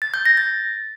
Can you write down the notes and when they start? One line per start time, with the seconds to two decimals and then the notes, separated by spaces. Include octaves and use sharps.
0.02 A6
0.14 G6
0.26 A#6
0.37 A6